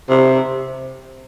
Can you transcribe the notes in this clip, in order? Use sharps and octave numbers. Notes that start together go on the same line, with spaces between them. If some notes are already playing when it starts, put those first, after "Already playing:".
C3